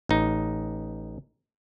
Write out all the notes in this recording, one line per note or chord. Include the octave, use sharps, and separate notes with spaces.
A1 D#4